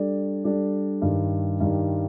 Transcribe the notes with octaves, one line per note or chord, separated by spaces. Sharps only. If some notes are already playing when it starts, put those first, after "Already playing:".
Already playing: G3 D4 A4 D5
G3 D4 A4 D5
G2 D#3 G3
G2 D#3 G3